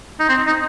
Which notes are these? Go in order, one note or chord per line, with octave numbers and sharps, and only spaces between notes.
D#4
C4
D#4